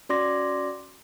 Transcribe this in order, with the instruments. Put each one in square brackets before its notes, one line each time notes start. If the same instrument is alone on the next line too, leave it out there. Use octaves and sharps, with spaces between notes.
[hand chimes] C#4 F#4 D5 C6 D6 A#6